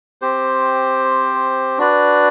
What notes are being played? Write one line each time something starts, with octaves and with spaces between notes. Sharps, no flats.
C4 G4 C5
D4 F#4 B4 D5